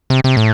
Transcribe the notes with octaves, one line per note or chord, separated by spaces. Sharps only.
C3
C3
A2